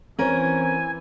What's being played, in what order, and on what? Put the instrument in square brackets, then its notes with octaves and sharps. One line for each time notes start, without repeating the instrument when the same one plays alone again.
[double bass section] E3 [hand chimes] C4 C5 [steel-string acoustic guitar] C#4 A#4 [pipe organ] G#5